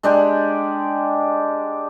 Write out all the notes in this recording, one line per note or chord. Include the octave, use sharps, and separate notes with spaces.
G#3 D4 G4